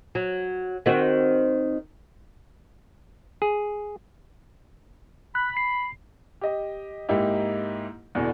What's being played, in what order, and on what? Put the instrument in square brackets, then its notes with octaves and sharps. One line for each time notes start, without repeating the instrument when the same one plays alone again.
[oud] F#3
D#3 C4 F#4
[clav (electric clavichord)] G#4
[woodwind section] B5 [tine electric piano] F#6
[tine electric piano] C7
[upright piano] G4 D#5
G#2 A#3 D#4 E4 G4
E2 B2 D3